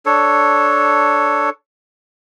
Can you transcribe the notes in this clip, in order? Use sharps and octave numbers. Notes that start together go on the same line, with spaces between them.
D4 A4 C#5